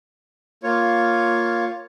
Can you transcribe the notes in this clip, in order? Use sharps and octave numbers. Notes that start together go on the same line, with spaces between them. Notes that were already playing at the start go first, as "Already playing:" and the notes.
A#3 F4 C#5